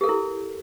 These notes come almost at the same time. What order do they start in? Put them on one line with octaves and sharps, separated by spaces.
G4 A4 A#4 E4